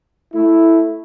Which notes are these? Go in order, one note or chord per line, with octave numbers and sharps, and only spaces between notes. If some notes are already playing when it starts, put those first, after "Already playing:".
A3 E4